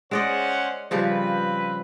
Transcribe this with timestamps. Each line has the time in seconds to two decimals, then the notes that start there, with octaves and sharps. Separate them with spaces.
0.11 G#3 C#4 C5 D5 D#5 F#5
0.91 C#3 F3 G3 C4 B4